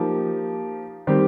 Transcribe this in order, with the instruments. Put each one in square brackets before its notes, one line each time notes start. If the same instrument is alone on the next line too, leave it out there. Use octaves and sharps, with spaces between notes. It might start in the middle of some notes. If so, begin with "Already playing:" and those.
Already playing: [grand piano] F3 A#3 D#4 G4
D#3 G3 C4 G4